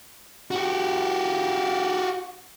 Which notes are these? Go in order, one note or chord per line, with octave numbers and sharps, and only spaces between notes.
F#4 G4